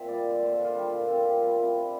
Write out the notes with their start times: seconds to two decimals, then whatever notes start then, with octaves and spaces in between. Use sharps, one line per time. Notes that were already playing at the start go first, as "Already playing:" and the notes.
Already playing: A#2 C4 A#4 C5 E5
0.08 G3 D5
0.26 D3
0.42 A#3 C5
0.54 A4
0.59 D4
0.64 F4
0.75 G3 G4
0.92 A#2
1.08 C4 A4
1.25 A#2 G4
1.42 G3 F4
1.59 C3 E4
1.75 D4